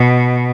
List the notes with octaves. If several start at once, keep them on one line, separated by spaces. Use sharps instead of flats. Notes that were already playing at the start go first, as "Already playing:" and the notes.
Already playing: B2